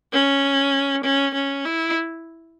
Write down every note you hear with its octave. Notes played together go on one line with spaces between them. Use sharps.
C#4
C#4
C#4
E4